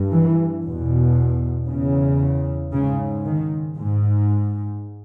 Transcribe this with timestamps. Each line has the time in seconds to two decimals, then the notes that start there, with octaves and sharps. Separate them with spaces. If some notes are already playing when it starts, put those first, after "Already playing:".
Already playing: G2
0.12 E3
0.64 E2 B2
1.68 E2 C#3
2.73 G#2 C#3
3.26 D#3
3.77 G#2